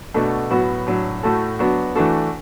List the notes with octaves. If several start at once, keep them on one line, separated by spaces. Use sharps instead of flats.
B2 A3 D4 F#4 A4
A2 F#3 B3 F#4
A2 F#3 D4
A2 A3 F#4 A4
F#3 B3 D4 F#4
E3 A3 D4 F#4 A4